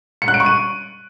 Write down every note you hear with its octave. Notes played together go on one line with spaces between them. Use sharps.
C#7
F#6
D7
C#6
D#7